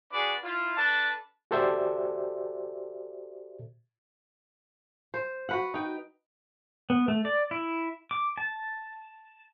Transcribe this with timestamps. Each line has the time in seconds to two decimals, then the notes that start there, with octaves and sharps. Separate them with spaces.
0.12 D4 F#4 G#4 B4 D5
0.43 E4 F4
0.77 D4 A4 B4 A5
1.51 F#4 G4 A4 C5 D5 E5
5.14 C5
5.49 F#4 B4 F#5
5.74 D#4 G5
6.90 B3
7.08 A3
7.25 D5
7.51 E4
8.11 D6
8.37 A5